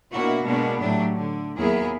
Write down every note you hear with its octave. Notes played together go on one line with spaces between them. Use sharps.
B2 A#3 D4 E4 F#4
B2 G#3 A#3 B3 D4 F#4
A2 F#3 A3 D4 G4
D3
D#2 F#3 B3 E4 G#4 A#4